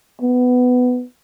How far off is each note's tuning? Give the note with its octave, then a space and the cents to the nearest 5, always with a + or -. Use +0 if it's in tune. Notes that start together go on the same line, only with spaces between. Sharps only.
B3 +15